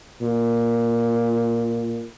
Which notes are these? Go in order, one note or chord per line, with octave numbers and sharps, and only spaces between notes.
A#2